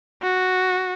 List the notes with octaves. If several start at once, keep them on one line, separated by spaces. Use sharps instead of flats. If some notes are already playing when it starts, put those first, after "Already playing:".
F#4